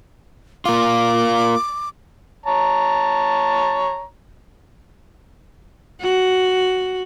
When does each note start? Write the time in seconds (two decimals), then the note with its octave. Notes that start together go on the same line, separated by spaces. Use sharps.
0.66 A#3 F4 D6
2.46 C#5 A5 A#5
6.01 F#4